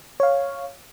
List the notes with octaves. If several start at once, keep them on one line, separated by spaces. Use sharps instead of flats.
C#5 F5